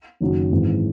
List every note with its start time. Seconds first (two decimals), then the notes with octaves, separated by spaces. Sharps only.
0.20 F#1 F#2 D#3 F#3
0.51 G#1 G#2 E3